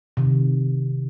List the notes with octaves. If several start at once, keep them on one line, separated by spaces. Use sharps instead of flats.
C3 D#3